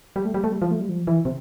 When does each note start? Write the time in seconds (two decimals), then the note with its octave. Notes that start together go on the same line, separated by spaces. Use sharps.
0.16 G3
0.25 A3
0.34 G3
0.44 A3
0.52 G3
0.62 F3
0.71 A3
0.80 G3
0.89 F3
1.07 E3
1.25 C3